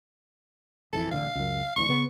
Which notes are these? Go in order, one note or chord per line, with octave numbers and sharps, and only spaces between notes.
G#1 F2 E3 A4
D1 A1 D3 F5
C#2 F#2
D1 D2 E3 C#6
C#3 B3